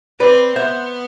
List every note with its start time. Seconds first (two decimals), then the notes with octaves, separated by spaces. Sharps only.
0.20 C4 B4 D5
0.56 B3 C5 E5